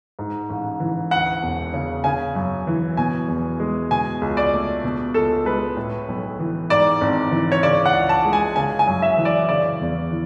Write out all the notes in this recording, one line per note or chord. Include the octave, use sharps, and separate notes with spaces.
G#2
A1
E3
D2 F#5
E1
C#3
C#3 G#5
F#2
E3
B2 G#5
E2
G#3
B2 G#5
C#2
D5
A3
B2
C#2 A4
G#3 B4
A2
B1
E3
G#2 D5
G#1
E3
C#5
C#3 D5
F#5
C#2
A5
G#3
G#5
C#3 G#5
G#5
F#2
E5
E3
D5
C#3 D5
E2
E3